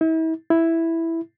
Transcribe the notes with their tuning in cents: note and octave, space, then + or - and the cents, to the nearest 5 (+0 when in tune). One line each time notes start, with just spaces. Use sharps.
E4 -40
E4 +0